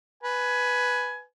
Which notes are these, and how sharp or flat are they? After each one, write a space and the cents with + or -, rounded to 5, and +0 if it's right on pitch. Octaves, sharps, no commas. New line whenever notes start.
B4 +0 G#5 +15